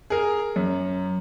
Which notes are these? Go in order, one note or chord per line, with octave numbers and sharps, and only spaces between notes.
G#4 A#4
F#2